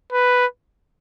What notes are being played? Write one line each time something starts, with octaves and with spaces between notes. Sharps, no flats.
B4